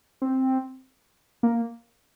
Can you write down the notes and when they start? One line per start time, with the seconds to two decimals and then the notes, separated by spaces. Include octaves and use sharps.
0.22 C4
1.43 A#3